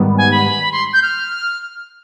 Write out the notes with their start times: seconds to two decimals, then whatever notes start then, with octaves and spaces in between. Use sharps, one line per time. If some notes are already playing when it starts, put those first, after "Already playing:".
Already playing: G#2 D#3 G3 B3
0.18 G#5
0.31 B5
0.72 C6
0.93 G6
1.03 F6